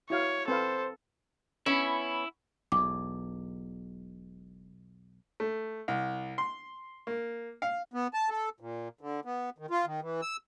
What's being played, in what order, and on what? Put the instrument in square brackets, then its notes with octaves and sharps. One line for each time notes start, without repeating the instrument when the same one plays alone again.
[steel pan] E4 F#4 F5 [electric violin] C#5
[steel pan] C4 B4 F5 [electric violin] A4 [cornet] C5
[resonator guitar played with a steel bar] B3 C#4 [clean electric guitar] E4
[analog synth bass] E1 [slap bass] B1 E2 [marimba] D6
[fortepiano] A3
C2
C6
A#3
F5
[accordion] B3
A5
A4
A#2
D3
B3
D#3
F4
D#3
E3
E6